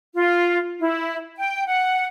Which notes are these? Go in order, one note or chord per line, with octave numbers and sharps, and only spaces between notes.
F4
E4
G5
F#5